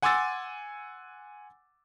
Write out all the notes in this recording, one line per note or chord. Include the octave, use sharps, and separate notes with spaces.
F#5 G#5 C6 D6 E6 A6